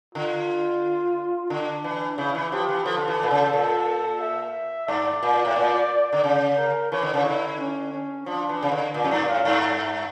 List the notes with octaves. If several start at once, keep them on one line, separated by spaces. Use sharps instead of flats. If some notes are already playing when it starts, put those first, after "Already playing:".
D3 F4
D3 D4
E3
C#3 E4
E3
F3 G4
E3
F3 A4
D3
E3
A#2
C#3
A#2
E5
G2 D5
A#2
A2
A#2
D3
C#3
A#4
E3 C#5
D3
C#3
D3 E4
C#4
C#4
F3 D4
E3
C#3
D3
A#2 D5
F2
G2
A#2
A2 F5
G2
E5